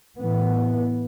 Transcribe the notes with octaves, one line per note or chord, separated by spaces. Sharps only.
A2 E3 B3